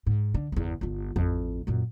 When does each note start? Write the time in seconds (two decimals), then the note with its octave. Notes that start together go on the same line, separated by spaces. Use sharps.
0.07 G#2
0.34 D3
0.52 G1 E2
0.81 G1 F4
1.16 A1 F2
1.67 F#2 A#2